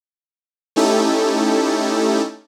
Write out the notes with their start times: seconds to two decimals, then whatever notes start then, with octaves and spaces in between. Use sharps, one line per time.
0.76 A3 C#4 D#4 E4 G4 A4